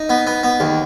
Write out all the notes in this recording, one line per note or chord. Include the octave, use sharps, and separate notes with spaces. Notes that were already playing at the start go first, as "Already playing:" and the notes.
Already playing: D#4
B3
B3
B3
D#2